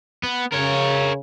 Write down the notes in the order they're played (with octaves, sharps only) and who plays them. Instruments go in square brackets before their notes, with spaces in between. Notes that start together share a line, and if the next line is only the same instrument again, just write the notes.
[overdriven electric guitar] B3
[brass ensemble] C#3 [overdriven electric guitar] A#4 C#5